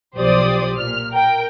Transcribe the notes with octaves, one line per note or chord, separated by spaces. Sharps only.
B1 F3 G4 C5 D5 D#6
A#2 F6
A#4 G5